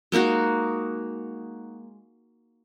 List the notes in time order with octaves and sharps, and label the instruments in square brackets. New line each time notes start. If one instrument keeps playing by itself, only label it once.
[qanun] G#3 A#3 D#4 F#4